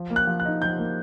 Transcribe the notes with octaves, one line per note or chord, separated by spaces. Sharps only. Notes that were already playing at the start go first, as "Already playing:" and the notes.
Already playing: F3
A#3
F#6
F3
F#6
D#4
F3 G6
A#3